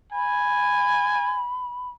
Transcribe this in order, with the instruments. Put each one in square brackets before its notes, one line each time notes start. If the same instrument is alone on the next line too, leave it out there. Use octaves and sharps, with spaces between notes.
[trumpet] G#5 [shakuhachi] B5